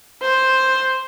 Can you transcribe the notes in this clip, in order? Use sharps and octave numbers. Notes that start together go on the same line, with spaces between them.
C5